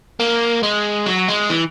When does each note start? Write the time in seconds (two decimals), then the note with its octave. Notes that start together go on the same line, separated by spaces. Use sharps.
0.20 A#3
0.63 G#3
1.06 F#3
1.28 G#3
1.50 E3